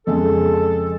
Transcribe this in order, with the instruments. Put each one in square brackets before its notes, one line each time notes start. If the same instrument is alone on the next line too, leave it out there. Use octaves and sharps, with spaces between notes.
[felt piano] F2 C#3 G#3 [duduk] A4